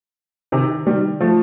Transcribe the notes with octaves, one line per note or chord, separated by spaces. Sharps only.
C3 D#3
D#3 G3
F3 A3